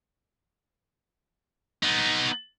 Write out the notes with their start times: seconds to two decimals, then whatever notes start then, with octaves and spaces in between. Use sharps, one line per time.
1.83 B3 D#4